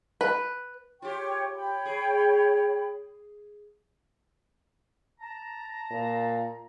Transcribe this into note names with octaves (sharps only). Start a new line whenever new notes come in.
B4
F4 G4 C#5 G5 C#6
C#5 G5 B5
G#4
A5 A#5
A#2